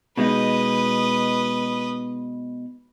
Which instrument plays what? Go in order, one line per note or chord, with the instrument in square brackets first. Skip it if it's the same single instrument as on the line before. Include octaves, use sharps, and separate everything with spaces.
[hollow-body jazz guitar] B2 G#3 D#4 [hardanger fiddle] B4 D#5